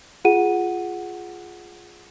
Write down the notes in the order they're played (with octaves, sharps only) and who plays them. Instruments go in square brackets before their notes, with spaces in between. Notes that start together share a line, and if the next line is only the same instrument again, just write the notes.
[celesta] F4 G#4 F#5 D#7